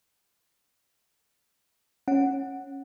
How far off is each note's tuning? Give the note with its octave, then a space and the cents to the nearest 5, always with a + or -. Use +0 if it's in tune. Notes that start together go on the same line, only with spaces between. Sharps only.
C#4 -15 F#5 +0